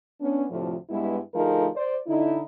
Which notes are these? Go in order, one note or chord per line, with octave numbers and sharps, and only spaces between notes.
B3 C#4 D4
D2 A2 C3 F3
G2 G#3 B3 E4
D2 F3 A3 D#4 G#4 A#4
C5 D5
D3 D#4 E4